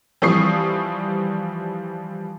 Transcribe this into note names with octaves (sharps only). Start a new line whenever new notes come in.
E3 F3 G3 C#6 D#6 C7